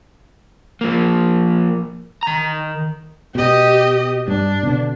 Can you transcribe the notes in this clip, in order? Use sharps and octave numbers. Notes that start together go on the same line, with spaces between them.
F3 A#3
D#3 A#5
B2 G4 D#5
G2 D4
B2 D3